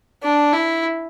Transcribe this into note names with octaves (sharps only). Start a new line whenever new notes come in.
D4
E4